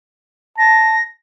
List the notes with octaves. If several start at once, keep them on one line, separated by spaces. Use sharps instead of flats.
A5 A#6